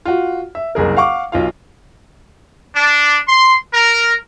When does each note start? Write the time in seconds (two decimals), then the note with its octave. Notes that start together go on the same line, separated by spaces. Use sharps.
0.05 F4 F#4
0.55 E5
0.75 F#1 C2 G#4 A#4
0.97 F5 F#5 C#6 D6
1.32 B1 F4 F5
2.76 D4
3.28 C6
3.74 A#4